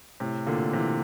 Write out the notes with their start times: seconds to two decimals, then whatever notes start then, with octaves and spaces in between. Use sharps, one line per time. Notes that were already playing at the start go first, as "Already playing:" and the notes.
0.20 A2 C3
0.47 A#2 D3
0.73 C3 E3